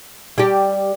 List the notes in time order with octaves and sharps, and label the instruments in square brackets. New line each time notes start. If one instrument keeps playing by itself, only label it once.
[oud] G3 G4